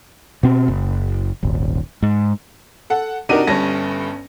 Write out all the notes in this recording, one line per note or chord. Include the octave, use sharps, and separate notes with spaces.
B2 C4
F#1
D#1 G#1
G#2
A4 F#5
C3 D4 D#4 F#4 A#4 D#7
G1 G2 C#4 A5 A#6